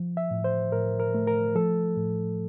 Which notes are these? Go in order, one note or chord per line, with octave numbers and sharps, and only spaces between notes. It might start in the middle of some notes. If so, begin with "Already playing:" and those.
Already playing: F3
E5
A2
C5
A2 A#4
A#4
A3
A#4
F3 A4
A2